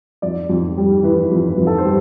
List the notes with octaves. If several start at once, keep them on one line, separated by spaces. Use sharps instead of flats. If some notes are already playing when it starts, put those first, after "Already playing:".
F2 D5
F2
G3
E3 B4
F2
B4
F2
A4
C5
G3